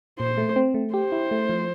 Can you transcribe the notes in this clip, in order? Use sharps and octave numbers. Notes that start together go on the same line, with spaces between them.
A#2 C5
A3
C4
A3
G4 C5
E4
A3
F3